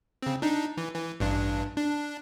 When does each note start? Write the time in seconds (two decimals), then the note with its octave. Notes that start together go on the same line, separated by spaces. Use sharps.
0.22 C#3 C4
0.42 D4 D#4
0.77 E3
0.94 E3
1.20 A1 G2 D4
1.77 D4